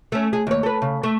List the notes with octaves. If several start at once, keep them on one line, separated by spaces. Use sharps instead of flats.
A3 C#4
G#4
D#2 C#5
A4 B4
C#3
A3